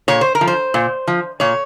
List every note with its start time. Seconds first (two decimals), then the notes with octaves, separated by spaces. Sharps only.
0.08 A#2 C#5
0.21 C5
0.35 A#4
0.41 F3
0.47 C5
0.74 A#2
1.07 F3
1.40 A#2 C#5